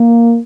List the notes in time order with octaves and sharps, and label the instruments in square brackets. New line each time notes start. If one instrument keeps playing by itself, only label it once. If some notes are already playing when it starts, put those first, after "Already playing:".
Already playing: [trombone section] A#3